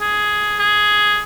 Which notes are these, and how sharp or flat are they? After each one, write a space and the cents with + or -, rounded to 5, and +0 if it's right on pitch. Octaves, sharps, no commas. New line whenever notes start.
G#4 +10
G#4 +5